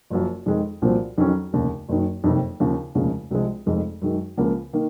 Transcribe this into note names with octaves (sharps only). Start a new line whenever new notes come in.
F#1 F#2 F3
F2 D#3 G#3
C2 A#2 F3 C4 F#4
F2 D#3 F#3 C#4
F1 D#2 C#3
F#1 F#2 D#3
F#1 F2 C3 D#3
D#2 C#3 F3
F1 D#2 C#3 F3 G#3
C2 C3 F3 G#3
F1 F2 D#3 G#3
F#2 D#3 G#3
C#2 C#3 F3 A#3
D#3 A#3